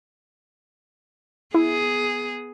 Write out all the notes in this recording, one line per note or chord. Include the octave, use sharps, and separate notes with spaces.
B3 E4 G#4